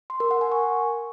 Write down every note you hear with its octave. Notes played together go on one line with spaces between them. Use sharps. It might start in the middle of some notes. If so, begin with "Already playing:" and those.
C6
A#4
F#5
G#5
C#6